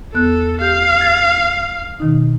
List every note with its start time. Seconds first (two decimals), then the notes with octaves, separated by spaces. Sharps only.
0.14 E2 B3 A4 F#6
0.61 G4 F5 G6
1.01 G#6 A6
2.00 B2 D#3 D#4